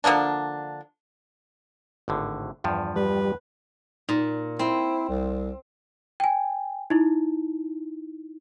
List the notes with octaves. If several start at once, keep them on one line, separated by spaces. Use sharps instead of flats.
D3 F3 A#3 D4
G#1 A2 D3
E2 G2 F3
G3 B4
A#2 D#4
C4 E4
C2
G5 G#5
D#4 E4